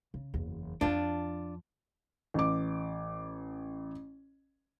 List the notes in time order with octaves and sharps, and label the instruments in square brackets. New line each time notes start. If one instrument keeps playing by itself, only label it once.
[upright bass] C#3
F#1 E2
[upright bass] F2 F3 [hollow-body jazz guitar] D4 F4
[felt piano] A1 D6